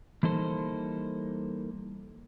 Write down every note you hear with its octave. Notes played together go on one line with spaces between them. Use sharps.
E3 G3 A#3 D#4 A4 C5